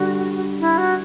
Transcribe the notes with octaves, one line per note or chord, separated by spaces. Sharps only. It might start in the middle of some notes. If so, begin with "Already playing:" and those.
Already playing: D3 G3 F#4
E4
F#4